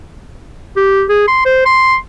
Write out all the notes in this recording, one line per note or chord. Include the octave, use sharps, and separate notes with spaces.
G4
G#4
C6
C5
C6